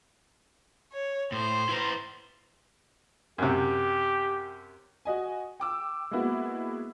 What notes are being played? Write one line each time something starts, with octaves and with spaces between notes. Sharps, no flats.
C#5
A2 C5
E4 B4 A#5
F#2 C3 G4
F#4 D#5 G#5
G5 D6 E6
G#3 A#3 B3 E4 F#4